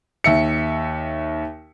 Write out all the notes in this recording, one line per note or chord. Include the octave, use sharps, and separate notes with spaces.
D#2 E5 C#7